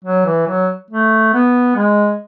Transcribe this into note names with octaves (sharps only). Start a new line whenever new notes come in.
F#3
E3
F#3
A3
B3
G#3